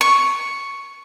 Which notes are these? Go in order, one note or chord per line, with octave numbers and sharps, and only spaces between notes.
C#6